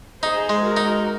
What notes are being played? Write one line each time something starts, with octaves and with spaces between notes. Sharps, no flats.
D#4 G#4 C5
G#3
F#4 A#4
D#4